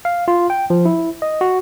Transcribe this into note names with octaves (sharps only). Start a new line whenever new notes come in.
F5
F4
G5
F3
E4
D#5
F#4